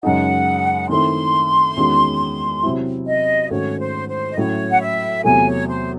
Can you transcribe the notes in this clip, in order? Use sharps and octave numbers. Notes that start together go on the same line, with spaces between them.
F#2 C#3 G#3 D#4 F#5
D#3 A3 C4 E4 C6
E2 D#3 G#3 C#4 F#4
C3 F#3 C4 E4
D#5
G#2 D#3 A3 C#4 F#4 C#5
C5
C5
D#5
A2 F#3 C#4 E4 C#5
F#5
E5
E2 C3 F#3 A3 G#5
C#5
C5